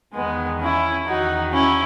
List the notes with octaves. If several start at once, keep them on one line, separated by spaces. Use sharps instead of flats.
E2 D#3 G#3 B3
C#4 E4
E2 D#3 D#4 F#4
C#4 E4